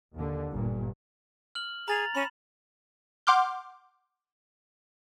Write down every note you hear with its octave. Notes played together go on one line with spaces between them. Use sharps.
D#2 D3
G1 G2 A#2
F6 F#7
G#4 A#5 A6 F7
C#4 B5 E7
F#5 C6 D6 F6 G6